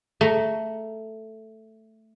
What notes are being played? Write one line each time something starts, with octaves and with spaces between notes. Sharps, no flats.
A3 A#5